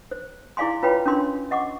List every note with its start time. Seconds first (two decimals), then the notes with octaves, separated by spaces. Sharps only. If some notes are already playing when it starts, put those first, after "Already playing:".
0.11 C5
0.57 E4 G#4 D5 F5 G#5 C6
0.83 F4 B4 C#5 G5 B5
1.06 C#4 D4 A#4 C6
1.51 D#5 F#5 C#6 D6